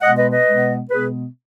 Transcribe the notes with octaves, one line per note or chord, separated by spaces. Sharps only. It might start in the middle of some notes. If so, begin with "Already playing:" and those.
B2 G#3 B3 D#5 F#5
B4 D#5
B4 D#5
B2 G#3 B3
B2 G#3 B3 G#4 B4